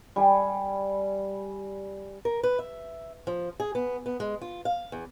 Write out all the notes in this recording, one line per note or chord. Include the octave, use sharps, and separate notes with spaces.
G3 G#5
A#4
B4
E5
F3
G#4
B3
B3
G#3
F4
F5
E2